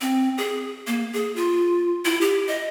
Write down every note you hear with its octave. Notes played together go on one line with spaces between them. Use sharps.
C4
G#4
A#3
G#4
F4
E4
G4
D#5